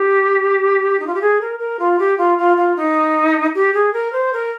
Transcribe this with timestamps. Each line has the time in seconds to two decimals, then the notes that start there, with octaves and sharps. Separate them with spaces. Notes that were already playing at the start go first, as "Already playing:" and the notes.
Already playing: G4
1.00 D#4
1.06 F4
1.14 G4
1.21 G#4
1.41 A#4
1.59 A#4
1.79 F4
1.99 G4
2.18 F4
2.38 F4
2.57 F4
2.76 D#4
3.55 G4
3.74 G#4
3.93 A#4
4.12 C5
4.33 A#4